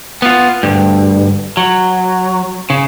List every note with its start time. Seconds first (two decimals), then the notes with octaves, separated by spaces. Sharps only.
0.22 B3 F4
0.63 D2 G2
1.57 F#3
2.70 C#3